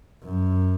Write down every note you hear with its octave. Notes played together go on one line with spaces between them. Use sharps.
F#2